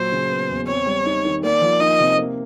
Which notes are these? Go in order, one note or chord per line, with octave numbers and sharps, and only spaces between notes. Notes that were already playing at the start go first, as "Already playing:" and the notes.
Already playing: A#2 F#3 C5
C#3
B3
E2
C4 C#5
G3
D#4
D#3
A#3 D5
F3
D#4 D#5
C3
A#3